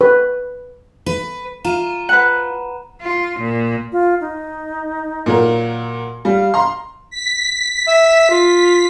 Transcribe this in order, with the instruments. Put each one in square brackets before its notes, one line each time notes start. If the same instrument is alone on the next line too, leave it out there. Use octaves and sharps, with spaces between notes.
[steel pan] B4
[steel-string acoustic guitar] B4
[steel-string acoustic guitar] F4 [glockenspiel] A#5 D#7 E7
[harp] B4 F#5
[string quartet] F4
A#2
[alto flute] F4
D#4
[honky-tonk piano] A#2 F#3 A#4
[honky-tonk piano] G3 [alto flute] F5
[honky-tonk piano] A#5 C6
[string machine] B6
[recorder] E5
F4